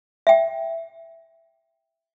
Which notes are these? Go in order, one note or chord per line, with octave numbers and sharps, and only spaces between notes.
E5 G5